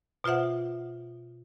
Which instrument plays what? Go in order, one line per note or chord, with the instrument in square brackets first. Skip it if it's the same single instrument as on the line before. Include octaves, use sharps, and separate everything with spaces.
[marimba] B2 F4 C5 E5 F#5